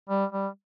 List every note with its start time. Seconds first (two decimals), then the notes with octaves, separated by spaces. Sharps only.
0.09 G3
0.32 G3